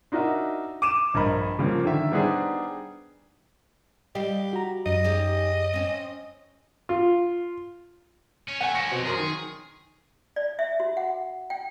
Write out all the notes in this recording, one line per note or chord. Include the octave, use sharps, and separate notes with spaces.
D4 D#4 F#4 A#4 D#5 E5
D6 D#7 E7
A#1 G2 A#4 D#5 B5
C#3 F3 G3 A#3
D3 D#3 E5
G3 B3 D4 D#4 G#4 C5
G3 G4 D#5 F5
F#4 A#5
F#2 D#5
D#4 G4 G#4
C4 C#4
F4
C#4
A3 F#5 G#5
F3 C#4 C#6 A#6 C#7
B2 C4
F#2 G#4 A#4 C6
D#3
D5
E5
F#4
F#5
G5